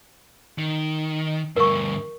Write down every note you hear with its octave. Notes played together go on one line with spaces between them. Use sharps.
D#3
D2 G2 A#4 C#6